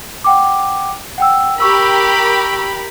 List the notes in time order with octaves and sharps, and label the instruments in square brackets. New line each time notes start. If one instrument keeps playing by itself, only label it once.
[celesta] F#5 G5 D6
F#5 G5 E6
[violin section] G4 A#4 B5 [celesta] C#6 E6